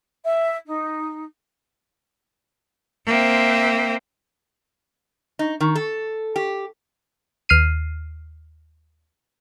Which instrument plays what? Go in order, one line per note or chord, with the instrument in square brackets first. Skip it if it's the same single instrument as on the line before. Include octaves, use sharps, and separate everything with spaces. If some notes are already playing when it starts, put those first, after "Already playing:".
[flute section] E5
D#4
[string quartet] A#3 C4 C5 E5 G5
[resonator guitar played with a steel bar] D#4
D#3
A4
G4
[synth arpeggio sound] D#2 F6 C7 D#7